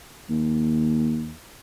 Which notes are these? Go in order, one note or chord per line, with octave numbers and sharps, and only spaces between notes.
D#2